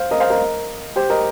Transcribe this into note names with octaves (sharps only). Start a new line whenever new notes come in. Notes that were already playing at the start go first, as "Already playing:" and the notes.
Already playing: C5 F5
A#4 D#5
C5 F5
A#4 D#5
G4 C5
A#4 D#5